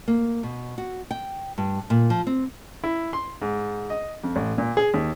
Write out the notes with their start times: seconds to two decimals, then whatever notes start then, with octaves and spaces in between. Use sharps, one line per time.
0.08 A#3
0.43 B2
0.78 F#4
1.11 G5
1.58 G2
1.90 A#2
2.10 F3
2.27 C4
2.84 E4
3.13 C6
3.42 G#2
3.90 D#5
4.24 F2
4.36 A1
4.58 A#2
4.77 G#4
4.94 D#2